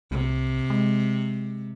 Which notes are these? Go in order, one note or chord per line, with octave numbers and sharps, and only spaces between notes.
C2 C3
G#3